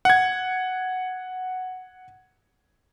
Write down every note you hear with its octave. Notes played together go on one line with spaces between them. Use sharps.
F#5 G#6